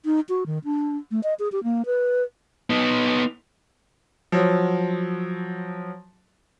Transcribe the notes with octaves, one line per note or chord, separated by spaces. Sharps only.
D#4
F#4
D#3
D4
A3
D#5
G#4
G4
A#3
B4
B3 D#4
F3 F#3